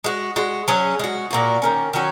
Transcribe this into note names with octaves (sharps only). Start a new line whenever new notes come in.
G#3 F#4
G#3 F#4
F#3 C#4 G#4
G#3 F#4
A#2 A#3 F#4
D#3 A#3 C#4
D#3 F#3 C#4 F#4